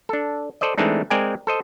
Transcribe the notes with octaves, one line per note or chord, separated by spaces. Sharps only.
D4 A4
A4 C5 D5 D#5
E3 G#3 A3 C4 D4 D#4
G#3 C4 A#4 D5 G5 G#5
A4 C5 D#5